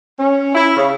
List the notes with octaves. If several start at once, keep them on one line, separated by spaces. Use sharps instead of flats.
C#4
E4
C#3